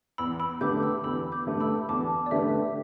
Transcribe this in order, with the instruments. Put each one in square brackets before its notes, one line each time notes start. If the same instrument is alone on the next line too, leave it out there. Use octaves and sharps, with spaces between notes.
[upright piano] E2 [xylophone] B5 E6
[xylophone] B5 E6
[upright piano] D3 A3 G4 B4 [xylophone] D6 G6
[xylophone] B5 E6
[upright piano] E2 [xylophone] B5 E6
[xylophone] D6 G6
[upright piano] D3 A3 G4 B4
[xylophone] B5 E6
[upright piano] E2 [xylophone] A5 D6
[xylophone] D5
[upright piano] D3 A3 G4 B4 [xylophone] E5